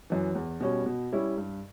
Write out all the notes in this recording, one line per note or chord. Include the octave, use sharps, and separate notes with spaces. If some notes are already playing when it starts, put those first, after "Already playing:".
F#2 E3
E2
B2 G3 C#4
B2
G3 C#4 E4
G2